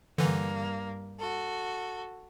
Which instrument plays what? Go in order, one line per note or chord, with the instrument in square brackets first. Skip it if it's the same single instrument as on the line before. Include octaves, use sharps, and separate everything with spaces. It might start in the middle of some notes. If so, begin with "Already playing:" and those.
[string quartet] G2 A#3 [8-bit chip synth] D3 E3
[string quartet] F#4 A4